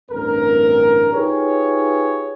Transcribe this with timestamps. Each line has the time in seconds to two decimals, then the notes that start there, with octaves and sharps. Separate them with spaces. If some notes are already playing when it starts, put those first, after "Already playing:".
0.11 A1 D2 G2 C4 A#4
1.14 D#4 F4 G4 G#4 B4 C#5